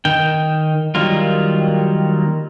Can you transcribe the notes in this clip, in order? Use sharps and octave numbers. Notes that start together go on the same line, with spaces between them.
D#3 G5
D#3 F#3 G3 A#3 F4